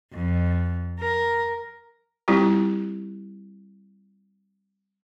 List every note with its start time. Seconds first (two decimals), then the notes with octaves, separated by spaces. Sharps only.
0.13 F2
1.00 A#4
2.28 G3 C4 E4 F4 G4